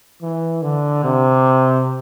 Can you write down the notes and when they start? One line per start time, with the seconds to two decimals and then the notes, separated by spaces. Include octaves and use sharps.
0.22 E3
0.62 D3
1.04 C3